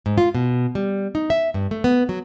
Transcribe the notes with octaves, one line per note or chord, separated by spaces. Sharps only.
G#2
F4
B2
G3
D#4
E5
G2
A3
B3
F#3